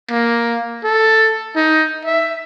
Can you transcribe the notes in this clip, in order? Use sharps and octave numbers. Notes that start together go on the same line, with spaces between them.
A#3
A4
D#4
E5